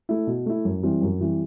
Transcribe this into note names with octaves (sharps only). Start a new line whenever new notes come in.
A3 E4
B2
A3 E4
F#2
E3 G3 C4
F#2
E3 G3 C4